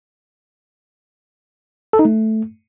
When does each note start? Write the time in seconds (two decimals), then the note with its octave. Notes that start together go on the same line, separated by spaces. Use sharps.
1.93 A4
1.99 D#4
2.05 A3